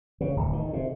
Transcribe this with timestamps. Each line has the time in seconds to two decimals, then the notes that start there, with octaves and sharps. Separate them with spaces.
0.21 C#3
0.36 D1
0.53 D#3
0.73 C3